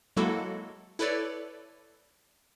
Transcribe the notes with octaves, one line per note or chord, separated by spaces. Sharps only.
F#3 G#3 A#3 E4 F#4 A4
E4 A4 B4 C#5 D5